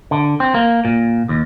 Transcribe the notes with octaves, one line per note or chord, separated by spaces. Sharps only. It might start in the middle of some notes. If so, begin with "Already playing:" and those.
D3
C4
A#3
A#2
D#2